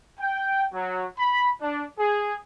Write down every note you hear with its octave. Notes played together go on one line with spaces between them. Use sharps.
G5
F#3
B5
D4
G#4